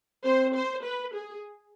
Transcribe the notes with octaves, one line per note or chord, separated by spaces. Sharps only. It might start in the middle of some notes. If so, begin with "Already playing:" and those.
C4 C5
C5
B4
G#4